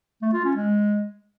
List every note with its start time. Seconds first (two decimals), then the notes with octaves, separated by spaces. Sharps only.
0.22 A3
0.33 F4
0.45 C#4
0.56 G#3